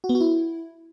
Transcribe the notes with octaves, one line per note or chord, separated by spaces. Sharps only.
F#4
B3
F#4
E4